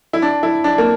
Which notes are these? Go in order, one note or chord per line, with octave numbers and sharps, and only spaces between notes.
E4
D4
E4
D4
A#3